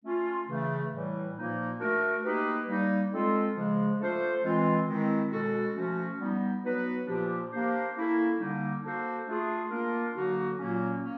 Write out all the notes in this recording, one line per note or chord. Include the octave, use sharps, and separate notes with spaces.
A3 C#4 F4
C#3 E3 A3
A2 E3 G3
A#2 F3 A#3 D#4
A3 D4 F#4 A#4
A#3 D#4 G4 B4
G3 A#3 D#4
G#3 C4 F4 A4
C#3 F3 G#3
A3 D4 F4 A4 C5
E3 G#3 C4 F4
D#3 G#3 C4 E4
B2 G#3 C#4 F#4 A4
F3 A3 C#4 F#4
G3 B3 D#4
F#3 B3 D#4 F#4 B4
A#2 F3 A#3 D4 G4
A#3 D4 G4 C5
A#3 C#4 E4 A4
D3 G3 A#3 D#4
A#3 D4 F#4 A4 C5
A3 D4 F4 G#4
A#3 D4 F4 A#4
D3 F#3 A#3 D#4 F#4
A#2 F#3 A#3 C#4
A#3 C#4